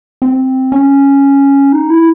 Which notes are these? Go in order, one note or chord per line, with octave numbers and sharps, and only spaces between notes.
C4
C#4
D#4
E4